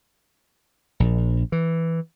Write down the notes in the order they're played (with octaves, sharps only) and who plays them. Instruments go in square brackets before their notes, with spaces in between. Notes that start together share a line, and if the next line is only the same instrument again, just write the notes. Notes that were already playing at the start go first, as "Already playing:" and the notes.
[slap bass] A#1
E3